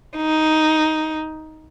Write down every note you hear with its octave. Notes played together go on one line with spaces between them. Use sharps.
D#4